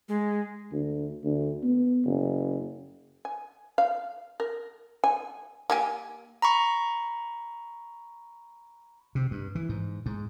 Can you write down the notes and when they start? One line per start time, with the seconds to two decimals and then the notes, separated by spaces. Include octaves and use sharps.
0.09 G#3
0.72 D2
1.24 D2
1.63 B3
2.05 F#1
3.25 G#5
3.78 F5
4.40 A#4
5.04 G#5
5.70 A#3 G4 G#5
6.42 A#5 B5 C#6
9.15 C3
9.31 G2
9.55 E3
9.69 G#2
10.06 G#2